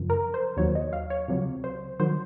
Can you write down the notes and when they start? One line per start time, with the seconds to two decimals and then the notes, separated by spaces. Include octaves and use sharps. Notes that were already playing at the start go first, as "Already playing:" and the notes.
Already playing: F#2 C#3 F3
0.10 A#4
0.34 C5
0.57 D#2 D#3 F#3 C#5
0.75 D#5
0.93 F5
1.10 C#5
1.28 C#2 C3 F#3
1.64 C5
2.00 D#3 F#3 C5